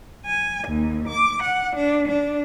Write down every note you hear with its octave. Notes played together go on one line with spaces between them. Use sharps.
G#5
D#2
D6
F#5
D4
D4